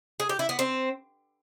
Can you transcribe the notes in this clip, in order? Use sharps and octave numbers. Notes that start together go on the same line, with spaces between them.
G#4
G4
E4
B3
C4